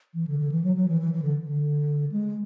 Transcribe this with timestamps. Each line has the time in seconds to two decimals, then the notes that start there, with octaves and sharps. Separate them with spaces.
0.14 E3
0.27 D3
0.39 D3
0.52 E3
0.64 F#3
0.76 F#3
0.88 E3
1.01 E3
1.13 E3
1.22 D3
1.42 D3
2.12 G#3